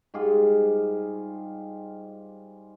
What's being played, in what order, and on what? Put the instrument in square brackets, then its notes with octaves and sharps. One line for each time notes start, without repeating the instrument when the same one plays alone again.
[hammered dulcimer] G#2 G3 F4 G#4